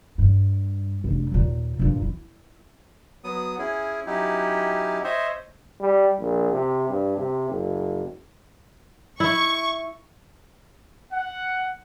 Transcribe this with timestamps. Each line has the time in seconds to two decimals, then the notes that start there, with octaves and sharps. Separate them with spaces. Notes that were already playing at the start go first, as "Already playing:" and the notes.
0.18 G2
1.04 F1 D4
1.32 D#2 A#2
1.79 G2 A#2
2.02 E4
3.24 F#3 B3 D#6
3.58 C#4 E4 G#4
4.07 F#3 C#4 D#4 E4 G4
5.04 C5 C#5 D#5 E5
5.80 G3
6.20 A#1
6.52 C3
6.89 G2
7.17 C3
7.49 F#1
9.20 E4 C#6
11.12 F#5